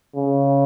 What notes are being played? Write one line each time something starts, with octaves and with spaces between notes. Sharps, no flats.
C#3